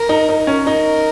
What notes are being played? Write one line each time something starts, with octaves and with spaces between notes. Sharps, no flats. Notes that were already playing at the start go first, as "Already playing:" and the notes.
Already playing: A#4
D#4
D#4
C#4
D#4 A#4